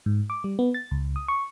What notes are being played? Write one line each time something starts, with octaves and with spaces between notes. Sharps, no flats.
G#2
D6
G3
B3
A6
C#2
D#6
C#6